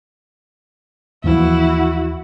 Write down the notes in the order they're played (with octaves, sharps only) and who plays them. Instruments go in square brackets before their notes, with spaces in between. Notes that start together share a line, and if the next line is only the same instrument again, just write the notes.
[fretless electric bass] D#2 E3 F3 [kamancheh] E4 F#4